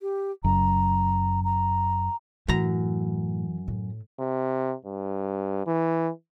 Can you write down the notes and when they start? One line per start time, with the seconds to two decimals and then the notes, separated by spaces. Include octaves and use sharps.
0.01 G4
0.44 F#1 F#2 A#5
1.44 A#5
2.48 F#2 A2 E3 A#5
3.68 A2
4.20 C3
4.85 G2
5.67 E3